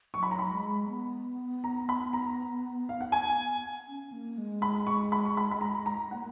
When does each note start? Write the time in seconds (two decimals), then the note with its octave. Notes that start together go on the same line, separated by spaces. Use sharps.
0.14 F#3 C#6
0.23 B5
0.31 A#5
0.39 B5
0.51 G#3
0.89 B3
1.64 A#5
1.89 B5
2.13 A#5
2.89 F5
3.01 F#5
3.12 G#5
3.88 C#4
4.12 A#3
4.38 G#3
4.62 B5
4.87 C#6
5.12 B5
5.26 C#6
5.37 B5
5.51 B5
5.61 A#5
5.86 A#5
6.11 A#3 F#5